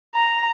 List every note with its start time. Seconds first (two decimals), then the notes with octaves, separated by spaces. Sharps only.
0.15 A#5